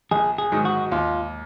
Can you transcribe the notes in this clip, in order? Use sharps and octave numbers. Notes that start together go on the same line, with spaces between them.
A#1 G#4
G#4
G#2 D#3 F#3
F#4
D#2 F4